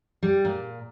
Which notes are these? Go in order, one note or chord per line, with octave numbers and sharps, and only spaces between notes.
G3
A#2